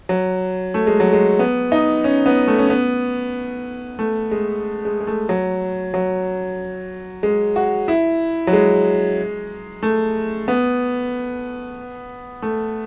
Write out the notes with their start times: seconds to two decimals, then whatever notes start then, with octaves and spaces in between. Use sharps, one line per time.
0.09 F#3
0.74 A3
0.87 G#3
1.00 F#3
1.13 G#3
1.39 B3
1.72 D#4
2.04 C#4
2.26 B3
2.48 A3
2.58 C#4
2.70 B3
3.99 A3
4.31 G#3
4.85 G#3
5.00 G#3
5.07 A3
5.29 F#3
5.94 F#3
7.23 G#3
7.56 F#4
7.88 E4
8.47 F#3
8.53 G#3
9.83 A3
10.48 B3
12.42 A3